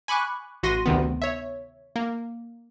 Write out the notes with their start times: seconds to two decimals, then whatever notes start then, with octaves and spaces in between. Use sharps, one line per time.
0.08 G#5 B5 C#6 D6 F#6
0.63 A1 F#4 C6 A#6 D#7
0.86 D2 C3 D#3 B3
1.22 C#5 E5
1.96 A#3